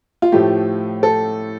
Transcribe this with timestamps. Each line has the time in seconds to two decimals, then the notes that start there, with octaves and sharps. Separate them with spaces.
0.22 F4
0.32 A2 F3 A3 G4
1.03 A4